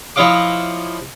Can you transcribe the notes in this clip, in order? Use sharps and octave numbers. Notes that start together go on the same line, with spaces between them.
F3 E4 C#5 D#5 F5 D6